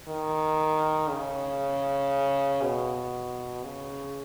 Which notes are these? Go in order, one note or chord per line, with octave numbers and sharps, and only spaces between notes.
D#3
C#3
B2
C#3